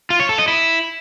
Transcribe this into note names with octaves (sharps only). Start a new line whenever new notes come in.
F4
C#5
A4
D#5
E4